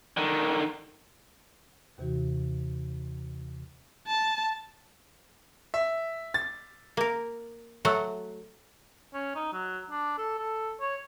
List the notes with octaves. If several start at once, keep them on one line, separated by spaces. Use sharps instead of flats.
D3 D#3
D#2 C3 E3 F#4
A5
E5
A6
A#3 A#4
F#3 A3 F#5
C#4
D#4
F#3
D4
A4
A4
C#5